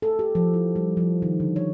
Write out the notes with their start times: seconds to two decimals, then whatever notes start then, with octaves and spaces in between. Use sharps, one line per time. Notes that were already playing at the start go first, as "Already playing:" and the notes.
0.02 A4
0.19 G4
0.35 F3
0.54 E4
0.76 G3
0.97 F3
1.22 D#3
1.40 D3
1.56 C#5